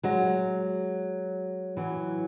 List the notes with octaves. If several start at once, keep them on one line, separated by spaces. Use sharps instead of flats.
F#3 G#3
E3 F#3